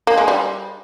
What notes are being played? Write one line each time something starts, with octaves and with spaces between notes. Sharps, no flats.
A#3
G#3
G3